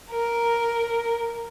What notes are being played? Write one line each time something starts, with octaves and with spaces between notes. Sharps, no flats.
A#4